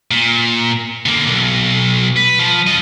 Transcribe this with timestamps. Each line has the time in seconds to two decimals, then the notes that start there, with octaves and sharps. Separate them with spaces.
0.11 A#2
1.06 D3 A#3
1.27 B1
2.16 B4
2.39 F3
2.67 F4 D#5